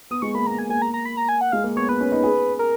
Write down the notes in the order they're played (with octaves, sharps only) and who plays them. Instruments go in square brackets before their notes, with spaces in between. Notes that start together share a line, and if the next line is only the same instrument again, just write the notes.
[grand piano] B3 [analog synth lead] D#6
[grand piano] G#3 [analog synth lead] C#6
[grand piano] A#3 [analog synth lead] B5
[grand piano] B3 [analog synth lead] A#5
[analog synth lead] G#5
[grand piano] A#3 [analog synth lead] G#5
[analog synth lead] A#5
A#5
B5
A#5
G#5
F#5
[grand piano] G#3 [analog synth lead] F5
[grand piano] A#3
[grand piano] B3 [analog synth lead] C#5
[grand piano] B3 [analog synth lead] B4
[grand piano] C#4
D#4
G#4
[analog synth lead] A#4